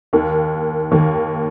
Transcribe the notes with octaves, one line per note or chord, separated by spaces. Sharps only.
D#2 D#3 A#3
D#2 D#3 A#3